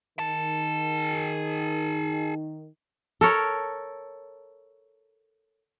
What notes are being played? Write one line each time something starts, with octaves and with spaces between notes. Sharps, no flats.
D#3 G#4 A5
A4 A#4 C#5